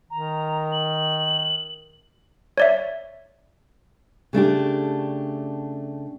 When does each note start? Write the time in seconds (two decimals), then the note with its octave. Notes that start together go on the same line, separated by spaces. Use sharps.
0.11 D#3 A#5
0.72 F#7
2.58 C#5 D5 E5
4.33 C#3 A3 D4 G4